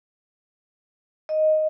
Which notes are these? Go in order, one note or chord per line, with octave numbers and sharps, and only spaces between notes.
D#5